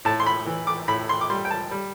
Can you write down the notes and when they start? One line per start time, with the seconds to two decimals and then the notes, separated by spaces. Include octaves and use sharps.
0.05 A2 A5
0.20 C6
0.27 B5
0.46 E3
0.67 D6
0.88 A2 B5
1.09 C6
1.21 D6
1.30 G3 C6
1.45 G5
1.51 A5
1.71 G3